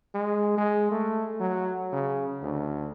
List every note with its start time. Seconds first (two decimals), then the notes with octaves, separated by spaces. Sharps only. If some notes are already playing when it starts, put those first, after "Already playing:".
0.14 G#3
0.58 G#3
0.91 A3
1.40 F#3
1.93 C#3
2.42 D2